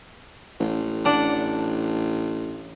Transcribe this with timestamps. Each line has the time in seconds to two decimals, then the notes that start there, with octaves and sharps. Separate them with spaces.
0.60 A1
1.05 D4 F#5